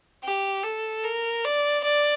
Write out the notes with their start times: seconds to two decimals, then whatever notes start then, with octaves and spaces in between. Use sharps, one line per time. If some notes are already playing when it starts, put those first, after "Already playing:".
0.24 G4
0.64 A4
1.05 A#4
1.45 D5
1.84 D5